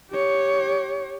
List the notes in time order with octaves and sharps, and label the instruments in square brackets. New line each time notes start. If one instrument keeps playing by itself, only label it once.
[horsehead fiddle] G4 C#5